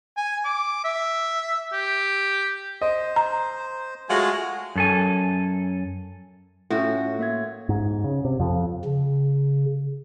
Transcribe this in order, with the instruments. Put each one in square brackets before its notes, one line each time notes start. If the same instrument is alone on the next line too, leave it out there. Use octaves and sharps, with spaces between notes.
[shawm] G#5
D6
E5
G4
[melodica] C5 [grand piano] D#5
[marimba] A#5
[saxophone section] G#3 F4 F#4 [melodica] A3 G#5
[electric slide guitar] F#2 A4 G#5
[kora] A2 F#4 [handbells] C#4 F4
[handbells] A#3 E5 G#6
[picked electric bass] G#2
C#3
C3
F2
[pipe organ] C#3